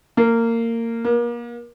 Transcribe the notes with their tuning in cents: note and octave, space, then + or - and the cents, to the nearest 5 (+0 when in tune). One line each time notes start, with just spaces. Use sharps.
A#3 -20
A#3 +35